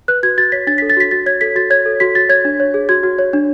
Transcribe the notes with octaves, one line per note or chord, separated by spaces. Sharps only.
B4 F#6
F#4 G#6
F#4 A6
C#5 B6
D4 A6
B6
A4
A6
F#4 B6
F#4 A6
C#5 G#6
A4 B6
F#4 A6
C#5 G#6
A4
F#4 B6
F#4 A6
C#5 G#6
D4
C#5
G#4
F#4 G#6
F#4
C#5
D4